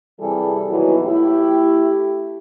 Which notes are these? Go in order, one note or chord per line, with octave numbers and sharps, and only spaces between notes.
C3 E3 G3 G#4 A4
D#2 B2 E3 F#3
A3 E4 G4